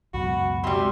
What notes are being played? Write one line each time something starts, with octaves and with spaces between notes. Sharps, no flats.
C#2 F#2 B2 F#4 B5
C3 G3 G#3 F#4 G4 C6